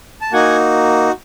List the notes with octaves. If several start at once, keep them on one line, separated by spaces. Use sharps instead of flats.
A5
A#3 D#4 F#4 F#5 G#5